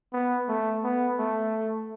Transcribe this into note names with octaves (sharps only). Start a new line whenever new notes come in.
B3
A3
B3
A3